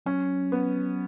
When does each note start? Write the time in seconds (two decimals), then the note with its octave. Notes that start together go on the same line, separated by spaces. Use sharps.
0.06 F#3 C#4
0.52 B3